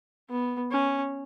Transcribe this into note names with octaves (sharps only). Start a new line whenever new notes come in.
B3
C#4